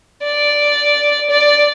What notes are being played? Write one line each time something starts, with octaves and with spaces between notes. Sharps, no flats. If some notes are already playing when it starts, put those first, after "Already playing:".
D5
D5